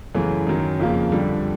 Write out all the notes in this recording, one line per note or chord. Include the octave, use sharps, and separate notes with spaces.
F#2 C#3 E3 A3
F#2 D#3 F#3
F2 C#3 F3 A#3
F2 D3 G3